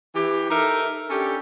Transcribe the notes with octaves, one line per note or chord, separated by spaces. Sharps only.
E3 G4
D#4 A4 A#4 E5
C#4 D4 G4 A4